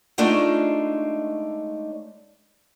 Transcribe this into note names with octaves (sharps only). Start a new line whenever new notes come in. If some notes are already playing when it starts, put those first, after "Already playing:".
G#3 A3 D4 D#4 F4 C#5